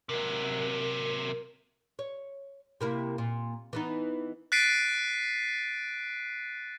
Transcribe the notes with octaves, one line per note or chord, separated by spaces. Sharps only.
C3 F#3 A#4
C#5
C3 A#3 E4
A#2
E3 B3 D#4
F#6 A6 B6 C7 D7 D#7